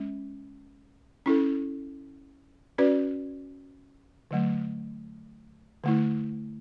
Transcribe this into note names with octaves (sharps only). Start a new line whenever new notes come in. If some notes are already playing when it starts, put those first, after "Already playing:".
Already playing: G#3 C#4
C#4 E4 A4
C#4 F#4 B4 D5
D3 F#3 A3
D3 A3 E4